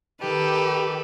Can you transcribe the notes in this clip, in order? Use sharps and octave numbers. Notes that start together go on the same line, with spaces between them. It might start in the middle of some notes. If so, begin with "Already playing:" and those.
D#3 G4 A4 B4